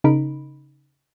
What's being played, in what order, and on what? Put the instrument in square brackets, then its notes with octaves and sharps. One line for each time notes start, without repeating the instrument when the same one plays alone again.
[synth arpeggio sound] C#3 D#4 A#4 B5 D7